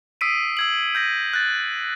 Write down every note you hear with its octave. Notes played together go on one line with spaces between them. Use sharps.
D#6 E6 B6 C7 D7 D#7
E6 G#6 F#7
G6 G#6 A#6 D#7
F#6 A6